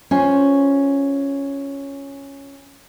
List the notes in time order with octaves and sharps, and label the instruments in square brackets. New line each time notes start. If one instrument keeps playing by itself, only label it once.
[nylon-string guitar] C#4 F4 C5 G#5